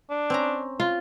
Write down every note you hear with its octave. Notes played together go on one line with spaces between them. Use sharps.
D4
C4 C#4 A#5
F4